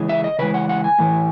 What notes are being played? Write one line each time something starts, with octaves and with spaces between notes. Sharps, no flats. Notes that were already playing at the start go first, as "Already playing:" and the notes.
Already playing: C#3 E3 G#3
E5
D#5
C#3 E3 G#3 B4
F#5
F#5
G#5
A2 E3 A3